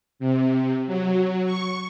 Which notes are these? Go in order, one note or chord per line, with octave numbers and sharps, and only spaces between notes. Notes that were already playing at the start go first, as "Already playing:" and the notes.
C3
F#3
C#6